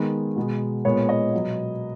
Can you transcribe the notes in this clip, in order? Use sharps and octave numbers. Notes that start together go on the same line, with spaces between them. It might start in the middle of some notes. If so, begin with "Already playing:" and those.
Already playing: D#3 G#3 B3
B2 G#3 B3
A#2 G#3 B3 C#5
D#5
B2 F#3 B3